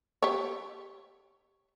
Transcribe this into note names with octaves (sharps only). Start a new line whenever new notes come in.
G4 C#5